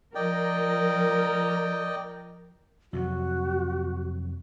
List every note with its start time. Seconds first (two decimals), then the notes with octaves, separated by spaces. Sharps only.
0.15 F3 A#4 D5 D#5 G5
2.93 F2 C3 F#3 F#4